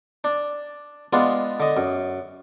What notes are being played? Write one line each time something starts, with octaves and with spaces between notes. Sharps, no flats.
D4
G#3 B3 D4 F4
D3 D#5
F#2